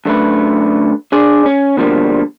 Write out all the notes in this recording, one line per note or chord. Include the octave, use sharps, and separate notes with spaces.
F#2 D3 A3 B4
D4 G#4 D5
C#4
B2 D3 F3 G3 A#3